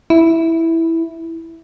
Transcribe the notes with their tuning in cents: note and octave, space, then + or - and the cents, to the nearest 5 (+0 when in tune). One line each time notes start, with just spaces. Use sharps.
E4 -5